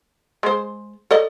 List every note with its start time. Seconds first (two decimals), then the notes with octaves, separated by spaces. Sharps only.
0.43 G#3 C5
1.11 A4 D5 D#5